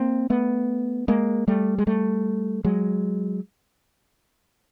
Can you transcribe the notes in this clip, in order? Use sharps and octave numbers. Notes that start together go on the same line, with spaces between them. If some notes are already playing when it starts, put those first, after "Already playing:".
Already playing: A#3 C4
A3 B3
G#3 A#3
G3 A3
G#3
G3 A3
F#3 G#3